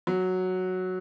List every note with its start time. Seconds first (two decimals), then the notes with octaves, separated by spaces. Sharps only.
0.07 F#3